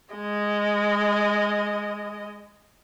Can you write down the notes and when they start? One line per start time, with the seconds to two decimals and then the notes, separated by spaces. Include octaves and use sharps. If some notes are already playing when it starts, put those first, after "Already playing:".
0.14 G#3 D#5